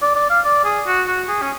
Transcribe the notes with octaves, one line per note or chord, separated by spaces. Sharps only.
D5
D5
F5
D5
G#4
F#4
F#4
G#4
C#4